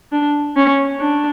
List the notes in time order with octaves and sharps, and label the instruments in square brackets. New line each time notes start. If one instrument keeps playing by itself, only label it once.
[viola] D4
C#4
D4